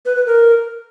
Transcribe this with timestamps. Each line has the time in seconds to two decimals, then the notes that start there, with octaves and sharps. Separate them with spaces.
0.06 B4
0.16 B4
0.26 A#4